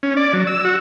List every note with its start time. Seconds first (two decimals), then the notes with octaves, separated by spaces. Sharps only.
0.03 C#4
0.17 D5
0.33 F#3
0.47 E6
0.65 F#4